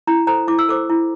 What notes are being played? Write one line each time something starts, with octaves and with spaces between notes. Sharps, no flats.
E4 A#5
A4 C5 A#5
E4 D6
E6
A4 C5 D6
E4